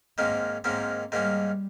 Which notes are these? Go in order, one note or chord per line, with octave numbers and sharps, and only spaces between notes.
G#2 D#3 A#3 C4 C#4
G#2 D#3 A#3 C4 C#4
G#2 D#3 G3 A#3 C#4